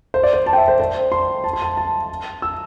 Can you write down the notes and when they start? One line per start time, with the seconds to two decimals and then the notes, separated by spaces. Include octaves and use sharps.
0.14 C5
0.23 D5
0.33 C5
0.46 A5
0.53 G5
0.58 E5
0.68 C5
0.80 C5
1.12 C6
1.44 A5
1.53 C6
1.62 A5
1.77 A5
2.42 E6